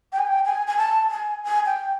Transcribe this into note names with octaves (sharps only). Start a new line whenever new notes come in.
G5
G#5
G5
G#5
G#5
A5
G#5
G#5
G5